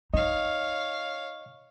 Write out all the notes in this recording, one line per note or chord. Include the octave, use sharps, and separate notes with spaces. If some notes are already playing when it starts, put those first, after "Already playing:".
D#4 C#5 D#5 F5